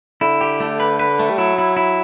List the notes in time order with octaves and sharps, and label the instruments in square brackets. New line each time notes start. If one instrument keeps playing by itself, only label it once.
[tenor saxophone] D3 [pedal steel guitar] E4
[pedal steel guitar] G4
A3
B4
B4
A3
[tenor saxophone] G3
[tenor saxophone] F#3 [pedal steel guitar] E4
[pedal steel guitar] E4
E4